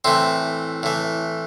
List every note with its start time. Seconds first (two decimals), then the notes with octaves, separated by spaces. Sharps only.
0.05 A2 E3 C4
0.83 A2 E3